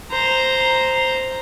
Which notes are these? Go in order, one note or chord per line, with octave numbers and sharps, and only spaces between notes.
C5 A#5